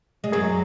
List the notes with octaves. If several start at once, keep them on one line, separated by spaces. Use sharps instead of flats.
G#3
F#2 F#3 G#4